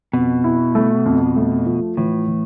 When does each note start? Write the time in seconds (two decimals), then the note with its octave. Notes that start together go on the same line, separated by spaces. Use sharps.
0.13 F2 B2
0.44 E4
0.75 A3
1.06 F2
1.36 A3
1.66 F3
1.97 A2 E3
2.28 E3